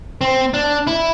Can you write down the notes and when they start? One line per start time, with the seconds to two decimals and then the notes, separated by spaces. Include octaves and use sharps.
0.21 C4
0.54 D4
0.87 E4